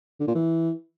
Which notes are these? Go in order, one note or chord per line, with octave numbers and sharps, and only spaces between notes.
D3
A#2
E3